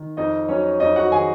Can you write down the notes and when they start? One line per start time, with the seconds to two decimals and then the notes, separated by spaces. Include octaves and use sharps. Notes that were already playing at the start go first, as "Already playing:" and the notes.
Already playing: D#3
0.17 F2 D#4 D#5
0.49 F#3 C#4 C#5
0.80 F2 D#4 D#5
0.96 F#4 F#5
1.12 D#3 G#4 G#5